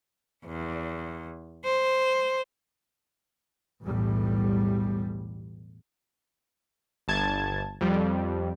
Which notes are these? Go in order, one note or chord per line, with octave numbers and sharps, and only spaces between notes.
E2
C5
B1 E2 A2 G3
G1 A5 G#6
F2 G3